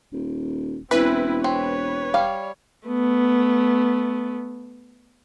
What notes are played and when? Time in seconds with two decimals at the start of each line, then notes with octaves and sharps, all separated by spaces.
0.13 D#1
0.91 E1 E3 C4 E4 B4
1.44 C4 C#5
2.14 G3 F5
2.88 A3 B3